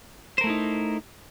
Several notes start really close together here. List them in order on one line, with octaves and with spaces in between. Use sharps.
C5 A#4 A3 E4 D#4